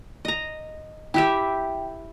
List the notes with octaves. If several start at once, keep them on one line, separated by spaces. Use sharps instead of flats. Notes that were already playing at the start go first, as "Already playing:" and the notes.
D#5 A#5
E4 G4 E5 G5